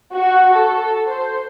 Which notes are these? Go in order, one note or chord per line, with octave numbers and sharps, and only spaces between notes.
F#4
A4
C5